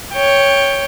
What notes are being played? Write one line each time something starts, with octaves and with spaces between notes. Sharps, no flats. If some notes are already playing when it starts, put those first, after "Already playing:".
C#5 G5